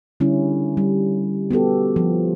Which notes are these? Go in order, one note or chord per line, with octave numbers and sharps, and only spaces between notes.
D3 G3 C#4 E4
G3
B3 F#4 G4 A4
F3